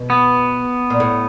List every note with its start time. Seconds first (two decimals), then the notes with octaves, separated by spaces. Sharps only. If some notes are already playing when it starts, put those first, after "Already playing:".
Already playing: B2
0.10 B3
0.90 A#2
1.00 A2